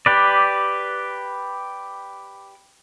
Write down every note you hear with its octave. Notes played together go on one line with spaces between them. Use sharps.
G4 B4 D5